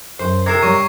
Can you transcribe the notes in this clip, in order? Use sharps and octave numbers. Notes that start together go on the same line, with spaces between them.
F#2 C5
C3 A#4 G#6 C7 E7
G2 G3 C#5 C#6